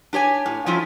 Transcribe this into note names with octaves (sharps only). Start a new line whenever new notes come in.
D4 G4 C#5 G#5
A2
F3 G3 A3 C#4 E4 F4